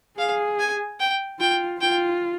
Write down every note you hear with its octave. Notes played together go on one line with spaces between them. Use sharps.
G#4 F5
G#5
G5
F4 G5
F4 G5